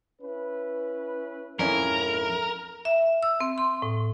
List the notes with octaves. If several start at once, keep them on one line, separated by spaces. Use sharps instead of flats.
C#4 E4 B4
A#1 F2 G#2 C#4 E4 A4 A#4
E5
E6
C4
C6
A2